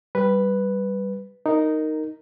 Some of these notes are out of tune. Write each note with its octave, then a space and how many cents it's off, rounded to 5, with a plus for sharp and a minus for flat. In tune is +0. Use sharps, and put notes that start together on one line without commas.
G3 -10 B4 +0
D#4 +0 A#4 -10